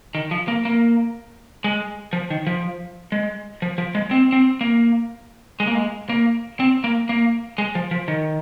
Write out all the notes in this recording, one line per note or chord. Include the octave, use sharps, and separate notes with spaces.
D#3
F3
A#3
A#3
G#3
F3
D#3
F3
G#3
F3
F3
G#3
C4
C4
A#3
G#3
A#3
G#3
A#3
C4
A#3
A#3
G#3
F3
F3
D#3